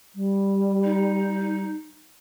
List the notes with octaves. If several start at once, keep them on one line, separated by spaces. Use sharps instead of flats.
G3
D#4